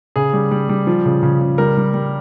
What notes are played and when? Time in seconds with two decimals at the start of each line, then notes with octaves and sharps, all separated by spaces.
0.16 C#3 G#4
0.33 G3
0.51 G3
0.69 G3
0.87 F3
1.05 C#3
1.23 C#3
1.41 C#3
1.58 G3 A#4
1.77 G3
1.94 G3